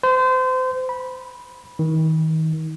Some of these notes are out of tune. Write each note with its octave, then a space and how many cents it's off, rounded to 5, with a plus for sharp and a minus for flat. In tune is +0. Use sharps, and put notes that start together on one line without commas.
C5 -30
B5 -15
D#3 +35